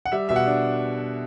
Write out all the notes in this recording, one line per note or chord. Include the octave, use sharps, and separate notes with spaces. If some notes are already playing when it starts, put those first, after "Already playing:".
F#5
G3 E5
B2 E5
F#5
D4